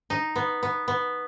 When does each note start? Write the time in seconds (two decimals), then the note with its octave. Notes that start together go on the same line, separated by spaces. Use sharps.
0.10 D#4
0.36 B3
0.63 B3
0.88 B3